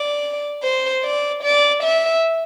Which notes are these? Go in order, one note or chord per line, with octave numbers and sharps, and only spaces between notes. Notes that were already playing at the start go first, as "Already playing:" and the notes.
Already playing: D5
C5
D5
D5
E5